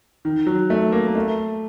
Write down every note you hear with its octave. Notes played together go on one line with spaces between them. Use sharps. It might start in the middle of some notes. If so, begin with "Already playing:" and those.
D#3
F#3
A3
A#3
A#3
A3